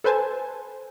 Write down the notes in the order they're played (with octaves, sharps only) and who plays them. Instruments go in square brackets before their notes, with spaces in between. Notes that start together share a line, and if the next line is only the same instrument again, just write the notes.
[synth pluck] A4 B4 C5 G#5 A5